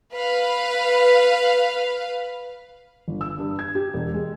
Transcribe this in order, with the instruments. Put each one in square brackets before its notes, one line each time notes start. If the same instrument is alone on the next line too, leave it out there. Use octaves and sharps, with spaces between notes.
[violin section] B4 F5
[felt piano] G1
E6
G2
G#6
G4
E1
G#3